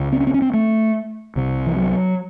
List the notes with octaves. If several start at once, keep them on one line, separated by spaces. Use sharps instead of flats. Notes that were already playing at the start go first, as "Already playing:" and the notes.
Already playing: C#2 C#3
C4
C#4
C4
C#4
C4
A3
C2 C3
E3
F#3